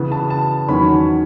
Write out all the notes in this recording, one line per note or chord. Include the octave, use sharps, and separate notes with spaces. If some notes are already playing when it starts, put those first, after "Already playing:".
Already playing: C#3 E3 B3
A5
A5
E2 D#3 F#3 C#4 B5